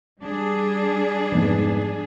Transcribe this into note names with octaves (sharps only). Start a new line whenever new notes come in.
G3 D4 G#4
F1 G#2 B3